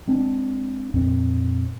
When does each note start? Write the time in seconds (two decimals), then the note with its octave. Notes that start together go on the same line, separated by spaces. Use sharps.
0.07 G#3 C4 D4
0.94 F2 A#2 C4